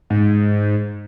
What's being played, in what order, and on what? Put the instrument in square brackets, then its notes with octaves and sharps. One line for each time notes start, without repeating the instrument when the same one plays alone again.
[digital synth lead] G#2